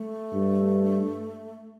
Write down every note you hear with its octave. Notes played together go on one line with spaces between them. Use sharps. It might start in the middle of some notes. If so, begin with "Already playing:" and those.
Already playing: A3
G2